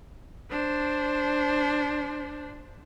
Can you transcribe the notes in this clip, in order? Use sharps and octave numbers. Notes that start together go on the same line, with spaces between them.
D4 C5